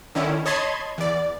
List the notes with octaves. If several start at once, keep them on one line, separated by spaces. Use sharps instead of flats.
D3 D#3 C#4 E4
C#5 D#5 A5 B5 C6 G#6
E2 D5